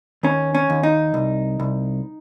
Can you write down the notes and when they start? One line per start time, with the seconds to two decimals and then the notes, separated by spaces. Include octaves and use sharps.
0.23 D#2 C#4
0.55 C#4
0.70 D#2
0.83 D#4
1.14 C2
1.60 C2